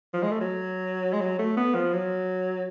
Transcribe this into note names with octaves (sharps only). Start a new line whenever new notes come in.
F3
G#3
A3
F#3
G#3
F#3
A3
B3
F3
F#3